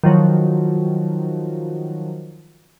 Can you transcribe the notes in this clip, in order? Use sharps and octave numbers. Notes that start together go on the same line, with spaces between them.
D#3 F3 F#3